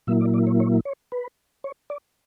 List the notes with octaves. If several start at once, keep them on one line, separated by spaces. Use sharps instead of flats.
A#2 F#3 A#3 E4 E5
D5
D5
C#5
C#5
C#5
B4
C#5
D5